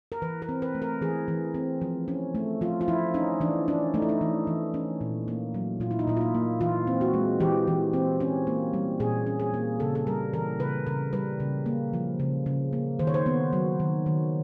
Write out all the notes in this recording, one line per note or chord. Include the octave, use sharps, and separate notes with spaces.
A#4
E3 B4
A#4
C4
B4
A3
A#4
E3 G#4
E3
C4
F3
C#4
A3
F3 F4
F4
F3 E4
C#4 D#4
E3 D4
C#4 D4
A3 D#4
E4
D#4
E3
E3
C#4
A#2
A#3
F#3
A#2 F4
E4
D#4
A#2 E4
F4
E4
A#3
E3 F4
C4
F#4
G#3
E3 G4
E3
C4
C#4
A#3
G3
A#2 G#4
C#4
G#4
A#3
C#3 A4
A4
G3 A#4
E3 A#4
C#3 B4
C#3 A#4
G3 B4
C#3
A#3
F3
C#3
C#3
A#3
D#3 C5
C#5
C5
B3
F#3
D#3
D#3